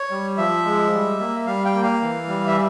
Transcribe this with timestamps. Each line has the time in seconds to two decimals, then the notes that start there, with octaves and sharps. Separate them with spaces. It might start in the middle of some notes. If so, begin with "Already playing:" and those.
Already playing: C#5
0.11 G3
0.38 F3 E5
0.65 G#3
0.93 G3
1.20 A#3
1.46 G3 F5
1.65 G5
1.74 A#3
1.83 F5
2.02 E3
2.29 G3
2.47 E5